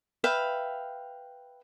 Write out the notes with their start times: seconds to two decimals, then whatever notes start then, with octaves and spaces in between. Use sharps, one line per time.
0.24 B4 E5 F5 G5